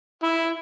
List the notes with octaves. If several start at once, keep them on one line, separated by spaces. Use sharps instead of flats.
E4